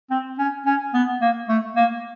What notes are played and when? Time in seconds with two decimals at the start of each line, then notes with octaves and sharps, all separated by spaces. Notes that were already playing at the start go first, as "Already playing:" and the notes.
0.11 C4
0.38 C#4
0.66 C#4
0.94 B3
1.21 A#3
1.49 A3
1.76 A#3